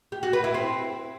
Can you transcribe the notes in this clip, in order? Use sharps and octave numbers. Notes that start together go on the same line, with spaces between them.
G4
F#4
B4
E4
C4